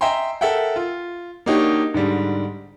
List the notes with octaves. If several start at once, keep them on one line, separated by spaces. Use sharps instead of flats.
D#5 E5 G5 G#5 A#5 C6
A4 A#4 E5 F#5 G5
F4
A#3 D4 D#4 F#4 G4 C#5
G#2 D3 G3